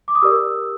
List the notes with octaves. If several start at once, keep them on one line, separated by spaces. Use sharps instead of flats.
D6
D#6
G4 A#4 D5 E6